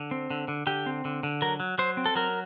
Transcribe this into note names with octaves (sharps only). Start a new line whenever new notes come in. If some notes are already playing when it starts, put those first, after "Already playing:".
Already playing: D3
C4
D3
D3
D3 G4
C4
D3
D3
F#3 A#4
F#3
F#3 C5
C4
A4
F#3 A#4